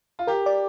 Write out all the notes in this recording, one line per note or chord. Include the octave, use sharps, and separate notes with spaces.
F4
G4 A#4
D5